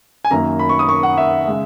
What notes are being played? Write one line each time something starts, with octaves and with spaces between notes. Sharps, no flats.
G#5
F#2 D#3 A#3 A#5
B5
C#6
D#6
C#6
F#5
E5
C#3 G#3